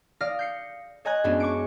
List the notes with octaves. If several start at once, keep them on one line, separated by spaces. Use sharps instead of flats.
D5 F5 D#6 F6 A#6
G6 C7 C#7
C#5 D#5 G#5 A#5 F#6 G#6
F#2 G#3 B3 C#4 D4
C#6 D6 C#7 D7